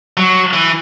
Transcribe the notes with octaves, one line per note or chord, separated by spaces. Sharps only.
F#3
E3